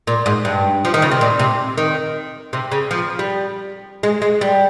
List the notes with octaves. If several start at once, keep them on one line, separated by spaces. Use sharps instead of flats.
A#2
G#2
G2
F3
D#3
C#3
C3
A#2
C3
D#3
C3
C#3
F3
G3
G#3
G#3
G3